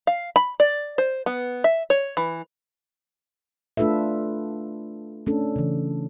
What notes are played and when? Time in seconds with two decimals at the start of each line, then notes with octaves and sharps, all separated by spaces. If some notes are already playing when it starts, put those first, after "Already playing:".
0.07 F5
0.36 B5
0.60 D5
0.98 C5
1.26 B3
1.64 E5
1.90 C#5
2.17 E3
3.77 A3 D4 F4 A4 B4 E5
5.27 A3 C#4 D4 A4
5.56 C#3 E3